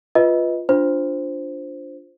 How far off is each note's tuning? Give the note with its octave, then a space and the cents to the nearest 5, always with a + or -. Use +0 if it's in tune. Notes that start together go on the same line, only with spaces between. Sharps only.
F4 +0 B4 +0 D#5 +20
D4 -15 F4 +0 C5 +0